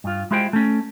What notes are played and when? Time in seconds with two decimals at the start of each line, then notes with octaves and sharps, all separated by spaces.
0.04 G2 F4
0.31 G#3 E4 F4 G4 C5 G5
0.53 A3 C#4